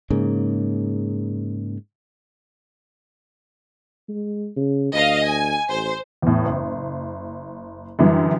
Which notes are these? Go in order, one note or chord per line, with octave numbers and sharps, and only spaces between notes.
G#2 C#3 A#3
G#3
C#3
D2 D#5 F5
G#5
A1 C5
E2 A2
F#1
F#2 D3 E3 G3